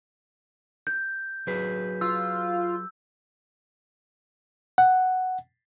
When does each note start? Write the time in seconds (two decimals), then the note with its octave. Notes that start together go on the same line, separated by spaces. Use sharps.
0.87 G6
1.47 F#3 G#4 B4
2.01 F4 E6
4.78 F#5